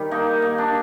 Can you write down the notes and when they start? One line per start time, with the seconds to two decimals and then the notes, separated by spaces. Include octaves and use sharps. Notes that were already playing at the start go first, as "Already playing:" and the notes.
Already playing: D#3 G3
0.11 A#3 D#4
0.42 A#3
0.58 D4